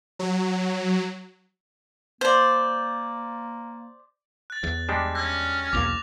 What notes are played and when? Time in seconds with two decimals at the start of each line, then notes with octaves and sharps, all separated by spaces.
0.19 F#3
2.21 A#3 C5 D5
4.50 F#6 A6
4.64 E2
4.89 G3 G#3 D4
5.15 C#4 F#6 A#6
5.73 B1 E2 A#3 D6 F7